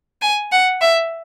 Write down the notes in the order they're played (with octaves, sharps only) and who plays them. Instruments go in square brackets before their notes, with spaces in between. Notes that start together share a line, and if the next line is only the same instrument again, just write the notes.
[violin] G#5
F#5
E5